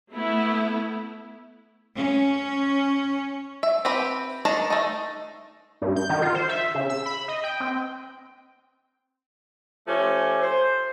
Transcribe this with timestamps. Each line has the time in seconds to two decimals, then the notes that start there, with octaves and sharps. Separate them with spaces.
0.12 A3 B3 E4
1.96 C#4
3.63 E5
3.85 C4 G4 B4 B5
4.45 D#3 D4 A5 A#5
4.70 A3 D#4
5.82 G2
5.96 G6
6.09 D#3
6.22 F4
6.35 C5
6.49 E5
6.75 C#3
6.90 E6
7.06 B5
7.28 D#5
7.44 G5
7.60 C4
9.87 F3 A3 C#4 G4 G#5
10.41 C5